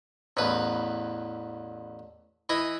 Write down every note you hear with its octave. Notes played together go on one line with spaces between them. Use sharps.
A1 E2 B4
E3 E4 D#5